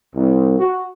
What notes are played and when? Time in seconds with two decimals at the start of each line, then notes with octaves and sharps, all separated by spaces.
0.16 C2
0.59 F#4